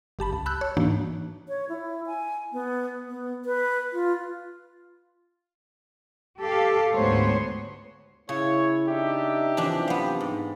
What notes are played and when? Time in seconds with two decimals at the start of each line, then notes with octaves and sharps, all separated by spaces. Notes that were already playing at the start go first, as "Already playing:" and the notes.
0.19 G1 G4 A5 B5
0.33 C#2
0.46 A5 B5 E6 F#6 G6
0.61 C#5
0.77 G#2 E3 A#3 D4 D#4 F#4
1.49 C#5
1.69 E4
2.07 G#5
2.53 B3
3.08 B3
3.45 B4
3.93 F4
6.40 G4 A4 F5
6.94 D2 G#2 G#3 B3 C5 C#5
8.29 C#3 E4 C#5
8.87 D4 D#4 G4 E5
9.57 F#2 C3 E3 F3 D4
9.88 B3 F5
10.21 G#2